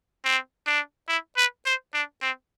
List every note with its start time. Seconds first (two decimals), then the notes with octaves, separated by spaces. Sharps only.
0.24 C4
0.67 D4
1.09 E4
1.37 B4
1.66 C5
1.94 D4
2.22 C4